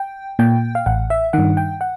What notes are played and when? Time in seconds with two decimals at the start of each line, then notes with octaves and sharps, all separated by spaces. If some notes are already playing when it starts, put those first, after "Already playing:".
Already playing: G5
0.39 A#2 G5
0.75 F5
0.86 A1 F#5
1.10 E5
1.33 G2 D#3 F#5
1.57 G5
1.81 F#5